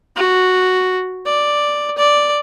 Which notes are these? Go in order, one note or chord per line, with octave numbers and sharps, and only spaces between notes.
F#4
D5
D5